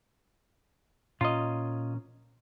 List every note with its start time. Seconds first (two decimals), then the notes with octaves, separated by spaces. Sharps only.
1.21 A#2 C#4 F4 D#5 A#5